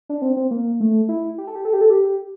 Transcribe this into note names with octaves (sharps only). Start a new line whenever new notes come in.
D4
C4
C4
A#3
A3
E4
G4
A4
G4
A4
G4
A4
G4